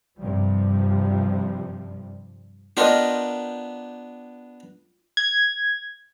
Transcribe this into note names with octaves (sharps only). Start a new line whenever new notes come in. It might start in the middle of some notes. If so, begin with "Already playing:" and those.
G2 C3 F3 G3
B3 D4 F4 G4 A#4 D#5
G#6